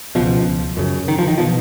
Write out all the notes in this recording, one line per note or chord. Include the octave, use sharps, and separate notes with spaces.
C#2 B2 F3
F#2 C#3
D#3
F3
D#3
B2 F3